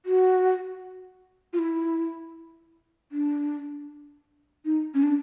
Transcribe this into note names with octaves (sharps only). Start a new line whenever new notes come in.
F#4
F4
E4
D4
D#4
C#4
D4